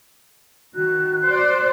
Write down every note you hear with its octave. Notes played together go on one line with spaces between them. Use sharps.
D#3 F#4 F#6
C5 D5